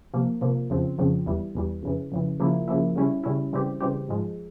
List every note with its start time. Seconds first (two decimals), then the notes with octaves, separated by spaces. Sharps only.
0.14 C3 F3 A#3
0.41 C3 F3 A#3
0.70 F2 C#3 F3 C4
0.98 F2 C#3 F3 C4
1.26 E2 E3 G3
1.55 E2 E3 G3
1.83 F2 C#3 E3
2.12 F2 C#3 E3
2.40 C#3 F3 A#3 E4
2.68 C#3 F3 A#3 E4
2.96 C#3 G3 C#4 E4
3.24 C#3 G3 C#4 E4
3.53 C#3 E3 G3 C4 G4
3.81 C#3 E3 G3 C4 G4
4.08 G#2 F3 G#3